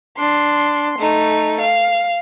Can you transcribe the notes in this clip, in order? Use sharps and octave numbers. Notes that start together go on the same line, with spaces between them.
D4 C6
A3 D#4
F5